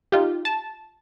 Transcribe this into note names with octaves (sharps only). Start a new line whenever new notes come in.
D#4 F4 G4
A5